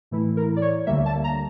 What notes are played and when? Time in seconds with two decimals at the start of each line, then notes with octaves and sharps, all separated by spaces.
0.11 A2 E3 A3 E4
0.37 A#4
0.56 D5
0.62 C#5
0.87 D2 D3 G3 A#3 E5
1.06 A5
1.24 A#5